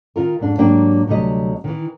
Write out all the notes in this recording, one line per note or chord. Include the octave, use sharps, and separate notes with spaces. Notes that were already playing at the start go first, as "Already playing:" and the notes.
D#3 F4 A#4
F2 G#2 D4
G#2 F#3 A#3 D4 G4 G5
D2 C3 F#3 G3 D#5
D#3 E3